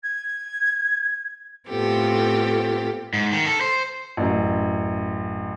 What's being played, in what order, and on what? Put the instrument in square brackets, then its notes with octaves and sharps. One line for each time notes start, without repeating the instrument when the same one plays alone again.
[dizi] G#6
[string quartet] A2 B3 C4 F4 G4 A4
[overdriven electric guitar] G#2
D#3
A4
C5
[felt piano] A1 F#2